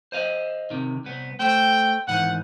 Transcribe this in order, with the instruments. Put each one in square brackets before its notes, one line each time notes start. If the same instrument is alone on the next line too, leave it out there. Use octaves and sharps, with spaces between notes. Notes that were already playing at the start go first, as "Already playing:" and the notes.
[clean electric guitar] C5 D#5 F5
C3 D#3
C2 B3
[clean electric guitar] A3 C5 [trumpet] G5
[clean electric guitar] G#2 D#3 E3 [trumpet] F#5